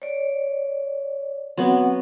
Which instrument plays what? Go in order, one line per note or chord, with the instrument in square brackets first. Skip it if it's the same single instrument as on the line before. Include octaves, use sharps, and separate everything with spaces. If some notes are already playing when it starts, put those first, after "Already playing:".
[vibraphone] C#5 D5
[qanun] F#3 B3 [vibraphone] C4 F#5